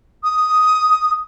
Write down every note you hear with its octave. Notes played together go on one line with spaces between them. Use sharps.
D#6